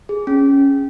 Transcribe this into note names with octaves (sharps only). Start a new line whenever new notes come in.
G#4
C#4